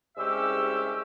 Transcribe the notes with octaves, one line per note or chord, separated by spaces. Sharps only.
C2 G#3 C#4 G4 E5 E6